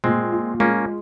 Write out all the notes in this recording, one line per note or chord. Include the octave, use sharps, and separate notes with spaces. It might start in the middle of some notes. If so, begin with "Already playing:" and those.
A#2 G#3 C4
F4
G#3 A#3 C#4